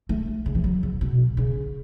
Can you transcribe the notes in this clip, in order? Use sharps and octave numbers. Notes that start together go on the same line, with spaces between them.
A3
C#3
E3
F#3
C#3
B2
C#3